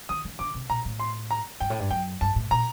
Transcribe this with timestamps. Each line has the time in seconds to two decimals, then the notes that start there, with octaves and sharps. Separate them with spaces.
0.09 D#3 D#6
0.25 D#3
0.39 D3 D6
0.54 C3
0.70 A#2 A#5
0.85 A2
1.00 C6
1.31 A#5
1.60 G2 G5
1.70 A2
1.80 G2
1.91 F#2 G5
2.21 G2 A5
2.36 A2
2.51 A#2 A#5